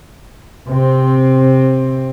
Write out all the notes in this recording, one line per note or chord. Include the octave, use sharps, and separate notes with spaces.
C3 C4